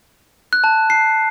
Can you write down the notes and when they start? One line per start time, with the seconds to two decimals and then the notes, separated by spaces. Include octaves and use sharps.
0.53 F#6
0.64 A5
0.90 C7